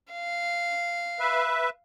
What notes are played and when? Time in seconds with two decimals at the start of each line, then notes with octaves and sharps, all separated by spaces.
0.13 F5
1.20 B4 E5